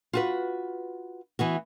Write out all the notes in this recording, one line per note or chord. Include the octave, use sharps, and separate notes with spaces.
F4 F#4 B4
E3 B3 F#4